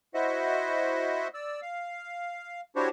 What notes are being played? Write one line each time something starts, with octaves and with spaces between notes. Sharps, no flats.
E4 F#4 C5 D#5 E5 F#5
D5 E6
F5
D4 E4 F#4 G4 C5 C#5